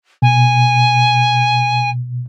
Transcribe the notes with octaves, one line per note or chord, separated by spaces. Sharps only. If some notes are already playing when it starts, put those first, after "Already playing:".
B2 G#5